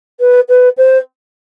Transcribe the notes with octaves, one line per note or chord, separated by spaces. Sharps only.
B4
B4
C5